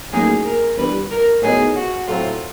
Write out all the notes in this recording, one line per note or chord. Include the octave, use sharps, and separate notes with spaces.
A1 A2 F#3 A#3 D#4 G#4
A#4
G1 G2 E3 G3 B4
A#4
A2 F#3 B3 D#4 G#4
F#4
A2 F#3 A3 C4 F4